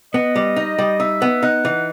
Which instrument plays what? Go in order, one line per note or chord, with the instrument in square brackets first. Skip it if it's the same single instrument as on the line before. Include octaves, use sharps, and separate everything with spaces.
[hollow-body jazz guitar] B3 [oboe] D#5
[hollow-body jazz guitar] G3
D#4
G3
[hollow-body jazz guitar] D#4 [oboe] E5
[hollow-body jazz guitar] B3
[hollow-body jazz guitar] D#4 [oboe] F#5
[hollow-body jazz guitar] E3